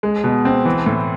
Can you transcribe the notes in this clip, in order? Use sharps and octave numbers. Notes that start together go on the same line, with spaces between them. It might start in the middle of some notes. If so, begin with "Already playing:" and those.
G#3
B2
C4
E3
A2